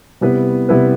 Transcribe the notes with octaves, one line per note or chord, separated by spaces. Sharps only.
C3 G3 B3 E4 B4
C3 G3 B3 E4 B4